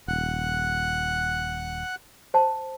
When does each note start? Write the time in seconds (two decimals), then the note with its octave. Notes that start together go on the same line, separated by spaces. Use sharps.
0.08 D#1 F#5 F#6
2.34 C5 A5